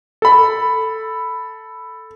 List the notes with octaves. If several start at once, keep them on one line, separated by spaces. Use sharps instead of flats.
A4 B5